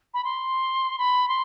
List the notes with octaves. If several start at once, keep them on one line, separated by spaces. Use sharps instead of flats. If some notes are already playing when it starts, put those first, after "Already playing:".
B5
C6
B5
C6